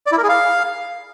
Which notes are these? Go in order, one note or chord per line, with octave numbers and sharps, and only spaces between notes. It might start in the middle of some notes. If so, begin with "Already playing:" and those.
D5
E4
A#4
G#4
F5